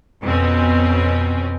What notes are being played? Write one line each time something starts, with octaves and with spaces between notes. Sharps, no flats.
F2 B2 C4 C#4